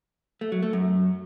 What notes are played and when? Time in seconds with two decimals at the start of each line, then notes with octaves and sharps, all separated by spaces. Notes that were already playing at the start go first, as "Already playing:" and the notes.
0.41 A3
0.52 F#3
0.63 A3
0.73 F#2